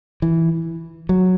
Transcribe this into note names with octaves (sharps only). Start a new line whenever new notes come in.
E3
F#3